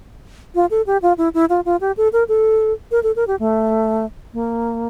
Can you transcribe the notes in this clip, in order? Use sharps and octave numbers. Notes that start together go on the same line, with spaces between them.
F4
A4
G4
F4
E4
E4
F4
F4
G4
A4
A#4
A4
A#4
A4
A#4
G4
A3
A#3